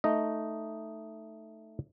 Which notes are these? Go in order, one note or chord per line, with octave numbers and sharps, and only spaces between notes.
A3 D#4 D#5